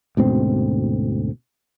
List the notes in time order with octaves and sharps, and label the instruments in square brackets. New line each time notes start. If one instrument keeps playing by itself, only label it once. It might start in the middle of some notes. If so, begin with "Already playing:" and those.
[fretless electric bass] D2 G#2 B2 C4